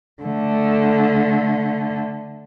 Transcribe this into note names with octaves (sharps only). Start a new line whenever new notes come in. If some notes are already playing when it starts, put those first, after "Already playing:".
D3 A3